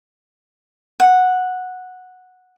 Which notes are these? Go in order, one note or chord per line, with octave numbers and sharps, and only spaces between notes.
F#5